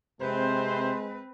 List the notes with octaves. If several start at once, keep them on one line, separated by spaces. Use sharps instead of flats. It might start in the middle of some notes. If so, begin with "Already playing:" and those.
C3 G#3 C4 B4 C5